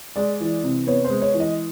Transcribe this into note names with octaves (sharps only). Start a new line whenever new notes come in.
G#3 D5
E3
C3
B3 C#5
C5
G#3
C#5
E3
D#5